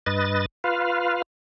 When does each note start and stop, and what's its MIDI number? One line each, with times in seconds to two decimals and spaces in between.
0.06 0.46 43
0.06 0.46 71
0.06 0.46 75
0.06 0.46 93
0.64 1.22 65
0.64 1.22 71
0.64 1.22 77